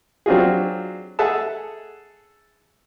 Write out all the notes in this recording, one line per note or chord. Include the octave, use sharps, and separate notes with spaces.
F#3 C4 D4 F4 F#4 G#4
G#4 A4 E5 F#5 A5